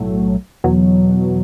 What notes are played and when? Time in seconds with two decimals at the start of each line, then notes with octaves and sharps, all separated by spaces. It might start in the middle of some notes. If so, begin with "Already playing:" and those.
Already playing: B1 A2 F#3 A3
0.64 E2 B2 F#3